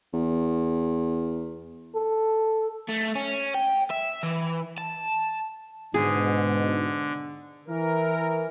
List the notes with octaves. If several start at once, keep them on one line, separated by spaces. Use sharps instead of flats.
E2
A4
A3
C#4
G5
E5
E3
A5
G#2 B2 D3 G#4
E3 A#4